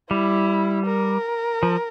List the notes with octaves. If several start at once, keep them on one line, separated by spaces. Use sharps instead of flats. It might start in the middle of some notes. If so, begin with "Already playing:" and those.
G3 E4
A#4
F3